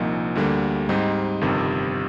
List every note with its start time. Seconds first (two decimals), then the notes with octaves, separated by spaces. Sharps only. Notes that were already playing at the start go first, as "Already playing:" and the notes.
Already playing: C2 A#2 F3 A#3 D#4
0.35 D2 D3 G3 A#3
0.89 G#2 G3 C4 D#4
1.41 G1 F2 C3 D#3 G3